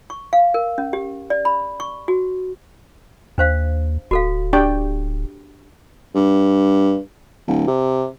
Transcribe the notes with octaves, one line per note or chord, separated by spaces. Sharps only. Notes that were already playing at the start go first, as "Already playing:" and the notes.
C#6
F5
A#4
C#4
G4
D5
B5
C#6
F#4
D#2 D4 C5 F5
D1 F#4 A4 F5
D4 G4 D5 G5
G2
D1
C3